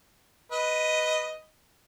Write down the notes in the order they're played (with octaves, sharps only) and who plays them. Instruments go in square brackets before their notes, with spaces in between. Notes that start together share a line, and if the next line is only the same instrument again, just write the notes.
[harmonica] B4 D#5